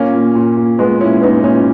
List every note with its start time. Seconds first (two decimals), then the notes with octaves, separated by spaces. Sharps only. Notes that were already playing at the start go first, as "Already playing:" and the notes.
Already playing: A#2 A#3 C#4
0.14 A#2
0.35 A#2
0.57 A#2
0.79 A#2 G#3 B3
1.00 A#2 C#4 E4
1.22 A#2 B3 D#4
1.44 A#2 C#4 E4